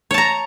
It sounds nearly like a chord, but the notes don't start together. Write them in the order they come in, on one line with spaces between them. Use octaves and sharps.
C#5 A5 A#5